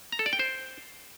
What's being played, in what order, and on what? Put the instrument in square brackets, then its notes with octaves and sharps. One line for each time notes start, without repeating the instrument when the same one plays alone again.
[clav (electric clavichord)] A#5
A4
D5
G5
C5